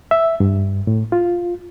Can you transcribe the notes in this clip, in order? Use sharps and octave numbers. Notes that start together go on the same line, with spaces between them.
E5
G2
A2
F4